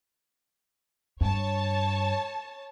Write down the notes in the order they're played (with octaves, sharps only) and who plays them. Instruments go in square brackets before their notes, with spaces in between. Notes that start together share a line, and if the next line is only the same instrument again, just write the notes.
[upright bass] G2 [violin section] C#5 A5